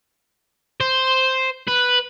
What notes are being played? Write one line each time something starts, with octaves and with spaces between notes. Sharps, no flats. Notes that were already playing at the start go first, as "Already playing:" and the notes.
C5
B4